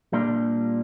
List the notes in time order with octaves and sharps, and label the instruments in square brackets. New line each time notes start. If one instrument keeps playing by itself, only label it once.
[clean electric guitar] A#2 G3 A#3 D4 F4